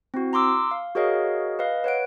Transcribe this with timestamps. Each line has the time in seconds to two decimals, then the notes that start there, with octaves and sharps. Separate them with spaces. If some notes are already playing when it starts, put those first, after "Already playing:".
0.14 C4 E4 F#4
0.33 A#5 C6 D6 E6
0.71 F5
0.95 F#4 G#4 A#4 C#5 D#5 F5
1.59 B4 D#5 F5
1.84 B4 C#5 F#5 D7